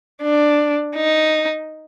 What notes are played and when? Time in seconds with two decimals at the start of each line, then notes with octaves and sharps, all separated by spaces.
0.22 D4
0.96 D#4